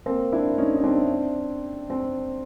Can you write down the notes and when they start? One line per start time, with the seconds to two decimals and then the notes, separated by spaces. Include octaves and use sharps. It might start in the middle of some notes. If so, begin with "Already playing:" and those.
0.06 A#3 C4
0.32 D4 E4
0.58 C#4 D#4
0.76 D#4
0.83 C4 D4
1.90 C4